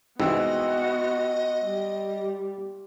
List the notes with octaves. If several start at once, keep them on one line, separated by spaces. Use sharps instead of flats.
C2 G#2 E3 B3 F#4 D#5
G3